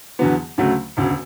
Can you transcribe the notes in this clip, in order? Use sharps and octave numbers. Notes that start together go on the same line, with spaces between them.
E2 D3 F#3 B3
D2 C#3 F#3 A3
E1 D2 C#3